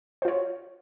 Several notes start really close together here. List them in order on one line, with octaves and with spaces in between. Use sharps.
C5 F4 C#5